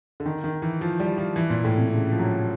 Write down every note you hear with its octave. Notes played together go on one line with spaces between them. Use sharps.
D3
D#3
D#3
E3
F3
G3
F3
E3
A#2
A2
C3
C#3
F3
F#3